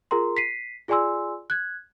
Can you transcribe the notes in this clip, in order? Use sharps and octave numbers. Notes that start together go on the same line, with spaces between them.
F4 G#4 A#4 A#5 C6
B6 C7 D#7
F4 G#4 D5 G#5 C6 E6
F#6 G#6